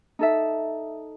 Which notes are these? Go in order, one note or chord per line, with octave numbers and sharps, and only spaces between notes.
D#4 A4 E5